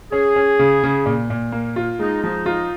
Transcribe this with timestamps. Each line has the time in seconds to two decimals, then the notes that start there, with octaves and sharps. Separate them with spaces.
0.12 C#4 G#4
0.36 C#4
0.59 C#3
0.84 C#3
1.06 A#2
1.30 A#2
1.52 A#3
1.76 F4
1.99 G#3 D#4
2.22 F3 D#4
2.46 D#4 F4